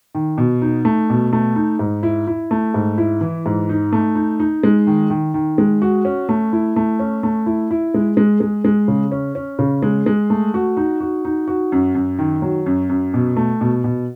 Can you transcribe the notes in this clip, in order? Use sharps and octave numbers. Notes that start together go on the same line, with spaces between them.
D#3
B2
D#4
A3
B2
A3
D#4
G#2
E4
E4
A3
G#2
E4
E3
G#2
D#4
A3
D#4
D#4
G#3
D#3
D#3
D#3
G#3
F#4
C#4
A3
E4
A3
C#4
A3
E4
E4
G#3
G#3
G#3
G#3
C#3
C#4
C#4
C#3
G#3
G#3
A3
F#4
D#4
F#4
D#4
F#4
F#2
F#2
D#3
F#3
F#2
F#2
B2
A3
B2
B2